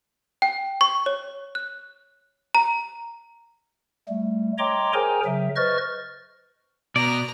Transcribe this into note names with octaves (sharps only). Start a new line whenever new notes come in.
G5
C#6
C#5
F#6
A#5
G3 A3
C#5 D#5 G5 A#5 C6 D6
G#4 A#4 C5 G5 G#5 A#5
C#3 F#3 E5
B4 C5 D#5 C#6 F6 A6
B2 D5 A#5